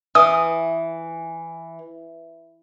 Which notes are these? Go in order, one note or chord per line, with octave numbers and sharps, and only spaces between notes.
E3 D#6